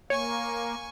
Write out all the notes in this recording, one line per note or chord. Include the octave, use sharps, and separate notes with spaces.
A#3 C#5 G#5 C#6